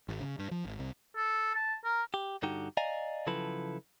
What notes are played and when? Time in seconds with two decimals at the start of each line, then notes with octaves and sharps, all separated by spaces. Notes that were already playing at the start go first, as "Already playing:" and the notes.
0.08 G#1
0.21 C#3
0.39 G2
0.51 F3
0.65 G#1
0.79 C2
1.16 A4
1.55 A5
1.84 A#4
2.14 G4
2.43 G2 D3 D#4 F#4 G4
2.77 D5 D#5 F5 G#5 A#5
3.27 C#3 F3 F#3 E4 A4 B4